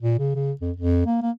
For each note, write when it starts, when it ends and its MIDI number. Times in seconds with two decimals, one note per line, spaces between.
0.02 0.18 46
0.19 0.35 49
0.35 0.52 49
0.61 0.72 41
0.76 1.05 41
1.06 1.17 58
1.22 1.31 58